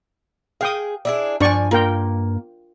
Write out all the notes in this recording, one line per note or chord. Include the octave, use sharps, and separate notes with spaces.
G#4 F5 G5 D#6
D4 E4 G#4
G2 F3 D4 D5 G#5 C#6
A#3 F4 A#4 G5